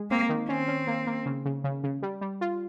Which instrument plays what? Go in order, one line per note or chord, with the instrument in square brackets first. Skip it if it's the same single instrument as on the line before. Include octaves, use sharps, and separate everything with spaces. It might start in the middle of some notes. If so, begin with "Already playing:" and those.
Already playing: [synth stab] G#3
[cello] A#3 [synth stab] C4
[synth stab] D#3
[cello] C4 [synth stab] C#4
[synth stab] C#4
A#3
A#3
C#3
C#3
C#3
C#3
G3
G3
F4